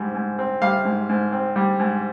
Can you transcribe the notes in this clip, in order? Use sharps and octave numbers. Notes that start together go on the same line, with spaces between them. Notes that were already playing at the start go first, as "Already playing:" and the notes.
Already playing: G#2 G3 C4
G#2
C4
G3 F5
G#2
G#2
C4
G3
G#2